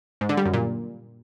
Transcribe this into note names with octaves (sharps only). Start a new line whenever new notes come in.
G#2
D3
G3
F#2
A#2